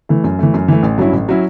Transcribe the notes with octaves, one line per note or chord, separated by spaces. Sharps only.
E3 A3
F#2
E3 A3
F#2
E3 A3
A1
G2 F#3 C#4 E4
A1
F#3 C#4 E4